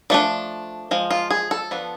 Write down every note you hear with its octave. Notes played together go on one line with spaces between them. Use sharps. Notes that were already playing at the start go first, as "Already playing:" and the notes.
F3 A3 D4 D5
F3 G#3
F4
G#4
A4
F3 B3 D4